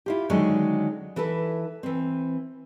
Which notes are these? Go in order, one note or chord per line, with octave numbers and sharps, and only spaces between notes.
E4 F4 G4
D3 D#3 F#3 G#3 C#4
E3 E4 A4 B4
E3 C4